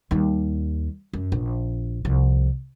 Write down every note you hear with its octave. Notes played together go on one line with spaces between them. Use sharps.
D#2 G3
F#2
A#1
C2 F3